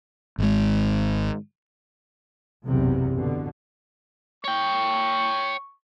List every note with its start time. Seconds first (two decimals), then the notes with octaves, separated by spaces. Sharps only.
0.38 G#1 G#3
2.67 F#1 B1 E2 C3
3.16 B2 D3
4.44 C#5 G5 C#6